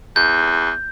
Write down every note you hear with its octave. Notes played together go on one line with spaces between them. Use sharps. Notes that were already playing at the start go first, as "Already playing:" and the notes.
E2 G6